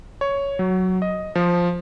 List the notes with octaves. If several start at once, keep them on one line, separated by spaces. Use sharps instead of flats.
C#5
F#3
D#5
F3